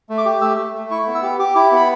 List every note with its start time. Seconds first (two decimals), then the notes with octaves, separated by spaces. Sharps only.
0.09 A3
0.18 D6
0.25 G4
0.41 A3 E6
0.58 A3
0.74 A3
0.91 E4 C#6
1.07 B3
1.15 E6
1.23 G4
1.39 G4 D6
1.55 E4
1.71 B3 B5